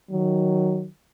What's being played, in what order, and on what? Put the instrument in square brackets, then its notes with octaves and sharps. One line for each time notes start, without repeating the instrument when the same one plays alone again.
[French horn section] D#3 F#3